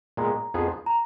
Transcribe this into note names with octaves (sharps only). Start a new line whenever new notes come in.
A#2 G#3 B3 A#5
F2 F3 B3 F4 G#4
A#5